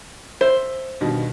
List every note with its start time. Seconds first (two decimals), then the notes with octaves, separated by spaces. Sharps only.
0.41 C5 E5
1.01 G2 B2 D#3